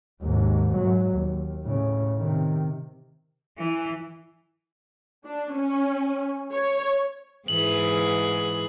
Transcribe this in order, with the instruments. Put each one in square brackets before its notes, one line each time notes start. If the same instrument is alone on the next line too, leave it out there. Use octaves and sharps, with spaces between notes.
[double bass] D#2 G#2
G#2 F#3
D#2
A2 C#3
C3 D#3
[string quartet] E3
[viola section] D4
C#4
C#5
[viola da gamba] G#2 E3 G#4 [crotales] F#7